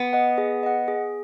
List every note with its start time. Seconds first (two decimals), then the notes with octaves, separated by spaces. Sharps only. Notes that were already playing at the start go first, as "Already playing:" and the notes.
Already playing: B3
0.13 D#5 F#5
0.38 G#4
0.63 D#5 F#5
0.88 G#4